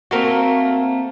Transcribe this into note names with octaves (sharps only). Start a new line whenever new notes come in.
A3 A#3 C4 F#4 A#4